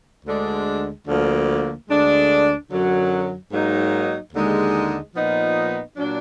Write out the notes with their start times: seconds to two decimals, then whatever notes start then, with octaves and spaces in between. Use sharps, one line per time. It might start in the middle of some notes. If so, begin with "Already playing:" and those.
0.26 D2 D3 G#3 D4
1.07 D2 D3 F3 A#3
1.89 D2 D3 G#3 D4
2.71 F#2 D3 F#3
3.51 G#2 F#3 A#3 D#4
4.33 D#2 D3 G#3 D#4
5.15 A#2 F3 B3 D#4
5.97 A#2 F#3 D4